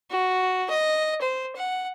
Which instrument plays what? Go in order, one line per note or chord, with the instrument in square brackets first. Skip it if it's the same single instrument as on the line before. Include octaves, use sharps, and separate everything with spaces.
[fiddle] F#4
D#5
C5
F#5